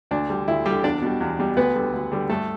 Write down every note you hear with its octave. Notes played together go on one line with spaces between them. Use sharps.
D2 D4
D3 G3
D2 E4
D3 G3 G4
E2 D4 D5
B2 G3
E2
B2 G3
D2 B3 B4
D3 G3
D2
D3 G3
G2 A3 A4